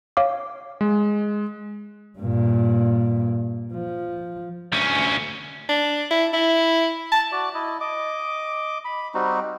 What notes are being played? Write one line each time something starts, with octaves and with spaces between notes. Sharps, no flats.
C#5 F5 D6
G#3
G2 A#2
F3
D2 C#4
D4
E4
E4
A5
F#4 D5
E4 D#5
D#5 D6
B5
G3 C4 D#4 F#4